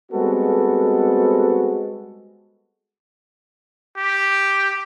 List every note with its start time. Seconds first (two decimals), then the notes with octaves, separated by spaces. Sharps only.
0.12 G3 G#3 B3 C4 F#4 A4
3.97 G4